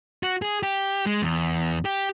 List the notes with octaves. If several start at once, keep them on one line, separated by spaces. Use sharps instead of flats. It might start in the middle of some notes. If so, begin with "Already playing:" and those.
F#4
G#4
G4
G#3
E2
G4